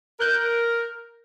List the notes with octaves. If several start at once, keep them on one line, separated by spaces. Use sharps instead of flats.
A#4 F#6 G6